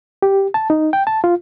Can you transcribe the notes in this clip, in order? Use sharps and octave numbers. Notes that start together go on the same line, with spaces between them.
G4
A5
D#4
G5
A5
F4